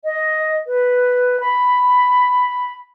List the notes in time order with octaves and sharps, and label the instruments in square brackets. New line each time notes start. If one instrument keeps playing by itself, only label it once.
[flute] D#5
B4
B5